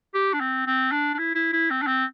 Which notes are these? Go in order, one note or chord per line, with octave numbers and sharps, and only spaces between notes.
G4
D4
C4
C4
D4
D4
E4
E4
E4
C4
D4
C4